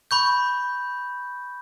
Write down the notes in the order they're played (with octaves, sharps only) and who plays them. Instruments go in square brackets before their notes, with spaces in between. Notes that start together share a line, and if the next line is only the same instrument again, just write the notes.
[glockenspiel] B5 C#6 G6